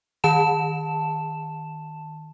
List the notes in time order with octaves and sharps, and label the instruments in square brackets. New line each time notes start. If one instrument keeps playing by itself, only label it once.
[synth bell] D#3 A5 E7